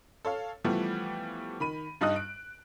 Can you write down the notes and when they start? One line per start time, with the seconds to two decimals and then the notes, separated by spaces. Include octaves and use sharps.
0.25 A4 C#5 F5
0.64 E3 F3 G3 A3 B3
1.60 D#3 B5 D#7
2.01 G2 G3 D#4 D#5 D#6 F#6
2.16 D7